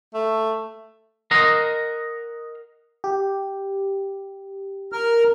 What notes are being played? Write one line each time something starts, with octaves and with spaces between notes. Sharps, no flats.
A3
A#4 D#5 F#5 A#5 C6
G4
A#4 F6